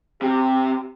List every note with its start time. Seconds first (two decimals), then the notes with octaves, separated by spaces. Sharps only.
0.22 C3 G4